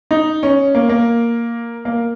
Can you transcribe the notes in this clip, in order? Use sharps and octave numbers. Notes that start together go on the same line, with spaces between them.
D#4
C#4
A#3
A#3
A#3